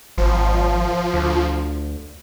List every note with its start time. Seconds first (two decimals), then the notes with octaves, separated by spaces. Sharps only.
0.18 G#1 F3
1.14 D2